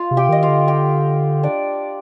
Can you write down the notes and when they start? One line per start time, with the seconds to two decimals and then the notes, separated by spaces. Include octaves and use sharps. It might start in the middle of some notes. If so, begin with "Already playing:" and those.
Already playing: F4 F5
0.11 C3
0.17 G4 G5
0.29 D#3 D#5
0.43 F4 F5
0.48 D3
0.68 G4 G5
1.43 D4 D5